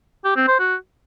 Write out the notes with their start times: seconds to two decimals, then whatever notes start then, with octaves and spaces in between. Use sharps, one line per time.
0.25 G4
0.36 C4
0.48 C5
0.59 F#4